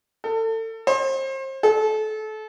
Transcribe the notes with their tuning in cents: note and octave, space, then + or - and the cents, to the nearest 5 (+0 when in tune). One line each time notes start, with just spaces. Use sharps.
A4 +30
C5 +35
A4 -30